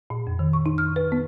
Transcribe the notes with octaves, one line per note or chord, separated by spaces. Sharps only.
A#2
F2
D#3
C#6
D#4
F6
B4
B3